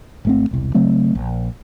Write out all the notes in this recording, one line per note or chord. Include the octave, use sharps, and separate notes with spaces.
G#1 A3 C4
E1 C2
C#3 F#3 A3 C4
A#1